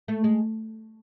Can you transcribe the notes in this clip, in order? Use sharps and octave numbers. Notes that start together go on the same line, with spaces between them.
A3
G#3